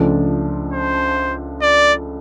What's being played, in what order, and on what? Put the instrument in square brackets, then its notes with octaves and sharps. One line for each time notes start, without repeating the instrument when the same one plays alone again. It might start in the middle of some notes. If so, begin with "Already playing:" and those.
Already playing: [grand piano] C#2 C#3 F3 A3 D4
[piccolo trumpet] C5
D5